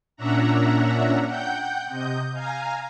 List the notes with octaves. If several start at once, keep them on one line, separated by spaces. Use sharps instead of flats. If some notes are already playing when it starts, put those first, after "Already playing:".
A#2 C#4 D4 E5 F#5 A#5
F#5 G5 G6
C3 D#5 G6
F5 G#5 A#5